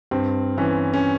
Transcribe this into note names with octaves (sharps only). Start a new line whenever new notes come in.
G2 C4
E3 C#4
C#4